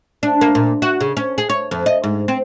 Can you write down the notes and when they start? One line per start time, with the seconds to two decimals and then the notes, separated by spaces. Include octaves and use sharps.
0.23 D4
0.41 A#3
0.55 A#2
0.82 F#4
1.01 C#3
1.17 C#4
1.38 G#4
1.50 C#5
1.71 F2
1.86 D#5
2.04 G#2
2.28 C4